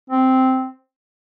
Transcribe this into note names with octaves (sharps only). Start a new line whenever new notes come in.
C4